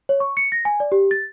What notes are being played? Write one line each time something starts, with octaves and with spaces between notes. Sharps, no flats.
C#5
C#6
C#7
A#6
G#5
D5
G4
A6